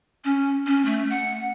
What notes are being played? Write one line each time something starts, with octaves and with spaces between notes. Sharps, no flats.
C#4
C#4
A3
F#5